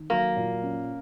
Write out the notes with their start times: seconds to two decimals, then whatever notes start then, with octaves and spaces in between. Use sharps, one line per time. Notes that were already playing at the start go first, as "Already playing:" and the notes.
Already playing: D#3
0.10 F#3 A#3
0.36 A#2
0.63 C#4